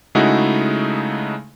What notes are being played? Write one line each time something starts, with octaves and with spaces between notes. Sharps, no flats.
C#3 G#3 A3 D#4 E4 F#4